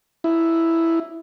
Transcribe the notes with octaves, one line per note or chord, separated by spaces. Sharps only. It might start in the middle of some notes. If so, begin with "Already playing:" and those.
E4